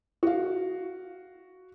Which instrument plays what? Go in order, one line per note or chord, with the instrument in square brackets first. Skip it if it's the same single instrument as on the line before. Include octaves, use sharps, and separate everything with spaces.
[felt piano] F#4 F5